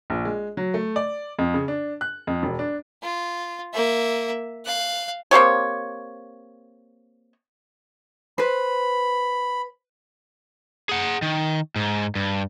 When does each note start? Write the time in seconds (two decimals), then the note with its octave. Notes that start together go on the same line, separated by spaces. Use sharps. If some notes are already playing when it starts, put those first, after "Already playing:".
0.10 A#1
0.25 G#3
0.57 F#3
0.74 A3
0.96 D5
1.39 F2
1.54 C#3
1.68 D4
2.01 F#6
2.27 F2
2.43 E1
2.59 D4
3.03 F4
3.74 A#3 E5
4.66 F5 F#6
5.31 A#3 C4 G4 C#5
8.38 B4 C5 B5
10.89 G#4 F#5
11.22 D#3
11.76 G#2
12.15 G2